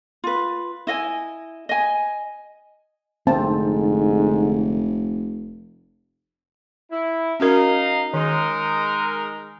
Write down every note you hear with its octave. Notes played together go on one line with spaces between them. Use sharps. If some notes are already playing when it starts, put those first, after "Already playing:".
F4 B4
E4 D#5 F5 G#5
D#5 G#5
F1 G#2 D3 C4 A5
E4
C#4 D#4 F#4 A#4 D#5 F5
D#3 G#3 D#4 A#4